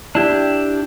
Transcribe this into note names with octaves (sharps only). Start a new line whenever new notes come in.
D4 E4 G4